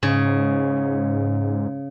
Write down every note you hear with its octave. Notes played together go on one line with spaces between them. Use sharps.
G#2 C#3